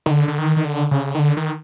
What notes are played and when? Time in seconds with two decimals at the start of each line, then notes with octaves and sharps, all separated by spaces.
0.06 D#3
0.11 D3
0.28 D3
0.38 D#3
0.56 D#3
0.65 D3
0.91 C#3
1.15 D#3
1.19 D3
1.37 D#3